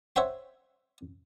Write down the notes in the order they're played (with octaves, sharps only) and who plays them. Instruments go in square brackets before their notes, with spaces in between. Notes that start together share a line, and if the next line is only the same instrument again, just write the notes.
[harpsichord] C5 C#5 E5 F#5 G5 C6